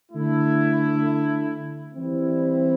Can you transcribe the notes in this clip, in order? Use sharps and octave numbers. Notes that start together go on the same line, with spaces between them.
D3 A3 E4
E3 G3 C4 E4